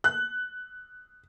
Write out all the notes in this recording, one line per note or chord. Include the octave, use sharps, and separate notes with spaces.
F#6